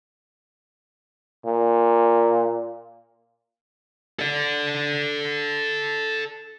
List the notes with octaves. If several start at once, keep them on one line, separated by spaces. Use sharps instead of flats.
A#2
A4 D5